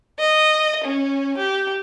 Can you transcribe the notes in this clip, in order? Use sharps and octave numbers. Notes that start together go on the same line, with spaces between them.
D#5
C#4
G4